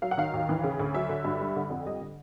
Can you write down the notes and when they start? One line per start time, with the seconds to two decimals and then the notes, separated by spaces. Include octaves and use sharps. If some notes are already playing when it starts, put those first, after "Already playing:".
0.02 F#3 F5
0.11 F#5
0.17 D#3 F5
0.34 D#2
0.49 E3
0.64 C#3
0.80 D2
0.94 F#3 E5
1.09 D3
1.25 G2
1.41 G3
1.56 D3
1.70 F2
1.86 G3 D#5
2.01 D3